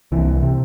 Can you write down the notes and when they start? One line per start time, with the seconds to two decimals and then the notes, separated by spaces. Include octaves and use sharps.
0.12 C2 E3
0.42 C3